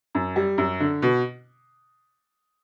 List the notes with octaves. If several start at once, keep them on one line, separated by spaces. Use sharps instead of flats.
F#2
G3
F#2
D3
B2